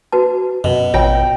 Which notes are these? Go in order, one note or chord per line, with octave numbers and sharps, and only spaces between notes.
F#4 B4 A5
F#2 B2
A1 F4 C#5 E5 G5